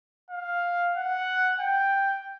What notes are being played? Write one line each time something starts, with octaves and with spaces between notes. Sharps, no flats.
F5
F#5
G5